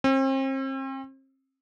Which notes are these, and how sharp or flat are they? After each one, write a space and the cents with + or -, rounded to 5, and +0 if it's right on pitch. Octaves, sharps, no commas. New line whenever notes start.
C4 +40